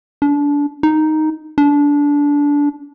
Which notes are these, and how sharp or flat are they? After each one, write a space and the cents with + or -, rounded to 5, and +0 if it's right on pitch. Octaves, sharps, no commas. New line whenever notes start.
D4 -25
D#4 +0
D4 -20